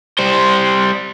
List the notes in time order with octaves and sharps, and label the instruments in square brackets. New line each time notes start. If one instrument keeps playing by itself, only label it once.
[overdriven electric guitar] G3 C5